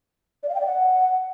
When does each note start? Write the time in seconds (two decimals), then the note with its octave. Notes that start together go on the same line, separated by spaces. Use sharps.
0.43 D5
0.49 F5
0.55 G5
0.60 D5
0.66 F#5